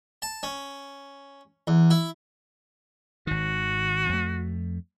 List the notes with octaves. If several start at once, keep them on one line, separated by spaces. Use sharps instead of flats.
A5
C#4
E2
E4
G#1 D#3 F#4
F2 A3